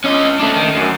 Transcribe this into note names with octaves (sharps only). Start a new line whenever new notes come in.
C#4 D#5
A3 D4
D#3
F#2